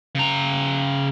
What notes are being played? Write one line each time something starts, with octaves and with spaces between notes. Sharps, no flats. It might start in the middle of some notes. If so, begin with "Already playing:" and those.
C#3 A#5